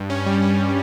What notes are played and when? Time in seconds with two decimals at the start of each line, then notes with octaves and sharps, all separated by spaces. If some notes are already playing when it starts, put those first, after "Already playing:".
Already playing: G2
0.10 C#4
0.26 G3
0.42 C#4